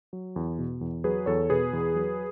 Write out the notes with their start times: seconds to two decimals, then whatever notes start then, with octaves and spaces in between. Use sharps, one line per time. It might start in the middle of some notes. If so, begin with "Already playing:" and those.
0.13 F#3
0.36 E2
0.59 B2
0.81 E2
1.04 F#3 G#4 B4
1.26 E2 A4 C#5
1.50 B2 G#4 B4
1.73 E2
1.95 F#3